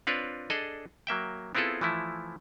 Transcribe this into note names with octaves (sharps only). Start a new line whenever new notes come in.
C4 D4 F4 B4 C#5 D5
D4 G#4 A4 D#5
F#3 A#3 E5 G5
B3 C4 E4 F4 G#4 A4
E3 F3 A3 E4